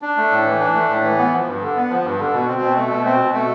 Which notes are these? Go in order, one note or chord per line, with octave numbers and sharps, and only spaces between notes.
D4
A3
A2
E3
D4
A3
A2
E3
B3
F3
G2
D3
B3
F3
G2
D3
B2
C4
B2
A3
B2
C4
B2
A3